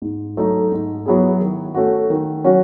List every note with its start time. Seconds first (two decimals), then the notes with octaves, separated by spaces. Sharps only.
0.02 G#2
0.37 F#3 A3 D#4 A4
0.72 G#2
1.06 F#3 B3 E4 G#4
1.41 D#3
1.75 A3 C#4 F#4
2.10 D#3
2.44 F#3 C#4 F#4